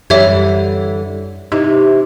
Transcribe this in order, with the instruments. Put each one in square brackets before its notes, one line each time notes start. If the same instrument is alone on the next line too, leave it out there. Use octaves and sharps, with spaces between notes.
[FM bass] F#2 [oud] D3 E3 G3 [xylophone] C#5 E5 G#6
[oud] C3 E3 [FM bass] D#4